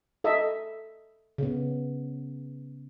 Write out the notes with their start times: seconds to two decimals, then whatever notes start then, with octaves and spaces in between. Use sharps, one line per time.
0.24 A4 D#5 E5
1.38 C#3 B3